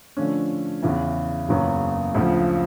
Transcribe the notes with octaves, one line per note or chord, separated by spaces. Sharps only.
D3 F3 A3 C#4
E2 C#3 E3
F#1 E2 C#3 F#3 B3
D2 C#3 F3